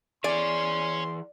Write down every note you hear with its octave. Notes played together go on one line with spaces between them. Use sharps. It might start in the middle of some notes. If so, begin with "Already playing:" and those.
E3 G#4 C#5 D5 G#5 C6